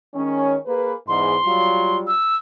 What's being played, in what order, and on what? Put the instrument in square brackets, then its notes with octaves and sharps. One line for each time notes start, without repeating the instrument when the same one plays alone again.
[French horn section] D#3 G#3 C#4
A#3 G#4 B4
[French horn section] E2 G#2 [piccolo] C6
[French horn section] F#3 G3 F4
[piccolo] E6